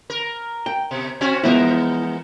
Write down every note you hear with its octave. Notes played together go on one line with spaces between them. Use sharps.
A#4
G5
B2
C4 C#4 F#4
E3 G#3 B3 E4 A#4